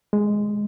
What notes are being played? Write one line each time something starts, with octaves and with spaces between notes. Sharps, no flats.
G#3